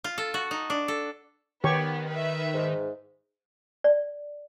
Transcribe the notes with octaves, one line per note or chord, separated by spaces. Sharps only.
F4
A4
F#4
D#4
D4
A4
D#3 B3 G4 C#5 C#6
B4 E5
G#2
D5